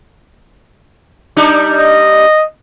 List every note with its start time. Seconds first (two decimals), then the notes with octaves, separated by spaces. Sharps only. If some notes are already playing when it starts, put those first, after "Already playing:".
1.37 G3 D4 D#4
1.77 D#5